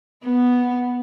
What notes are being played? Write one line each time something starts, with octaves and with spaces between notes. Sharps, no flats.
B3